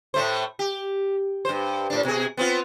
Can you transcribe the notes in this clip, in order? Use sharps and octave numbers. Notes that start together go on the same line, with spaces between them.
A2 A3 C5
G4
G2 C5
A2 D4
B2 G#4
B3 C4 F4